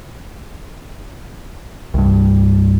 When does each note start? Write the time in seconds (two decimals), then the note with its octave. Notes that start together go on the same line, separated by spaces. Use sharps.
1.94 C2 G2